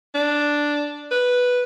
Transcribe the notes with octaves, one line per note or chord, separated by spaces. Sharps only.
D4
B4